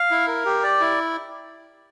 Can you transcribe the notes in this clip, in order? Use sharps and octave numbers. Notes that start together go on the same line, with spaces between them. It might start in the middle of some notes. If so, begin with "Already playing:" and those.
Already playing: F5
E4
A#4
G4
D5
E4